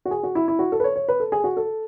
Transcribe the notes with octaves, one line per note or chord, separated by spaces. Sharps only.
F#4
G#4
F#4
E4
E4
F#4
A4
B4
C#5
C#5
B4
A4
G#4
F#4
A4